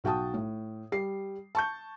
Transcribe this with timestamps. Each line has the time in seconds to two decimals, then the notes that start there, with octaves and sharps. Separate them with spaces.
0.04 B1 F#4 G5 A5 D#6
0.34 A2
0.92 G3 C7
1.55 A5 C#6 G6